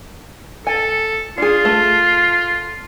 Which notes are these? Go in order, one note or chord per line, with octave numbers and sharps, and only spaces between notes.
A4 G#5
D4 F4 G#4
A3